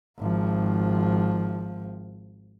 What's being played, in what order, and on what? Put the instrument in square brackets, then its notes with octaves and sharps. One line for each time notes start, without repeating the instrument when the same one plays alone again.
[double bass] G#1 F3